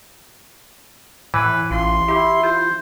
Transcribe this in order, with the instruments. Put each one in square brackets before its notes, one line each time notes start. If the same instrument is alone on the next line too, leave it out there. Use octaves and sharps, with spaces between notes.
[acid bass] A2 [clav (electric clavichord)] E3 [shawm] B4
[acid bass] A1 [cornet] F4 [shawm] C6
[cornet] E4 [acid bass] G4
[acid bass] F4 [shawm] C5